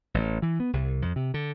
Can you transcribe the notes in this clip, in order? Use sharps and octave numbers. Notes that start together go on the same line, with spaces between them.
A1
E3
B3
C2
F2
C3
D3